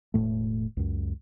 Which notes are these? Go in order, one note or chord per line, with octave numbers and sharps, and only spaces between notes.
E1 F#2 A2 A3
C#2 F#2